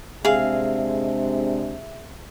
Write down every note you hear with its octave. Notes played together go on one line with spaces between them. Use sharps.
C3 G#3 D4 G#4 E5 F5